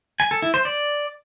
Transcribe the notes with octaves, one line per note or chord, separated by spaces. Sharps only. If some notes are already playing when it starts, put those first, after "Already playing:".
G#5
A4
E4
C5
D5